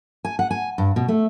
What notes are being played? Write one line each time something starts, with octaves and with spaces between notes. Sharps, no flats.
G#5
F#5
G#5
G2
B2
A3